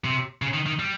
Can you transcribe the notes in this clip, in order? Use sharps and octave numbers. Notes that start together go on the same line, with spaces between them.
C3
C#3
D#3
D#3
G3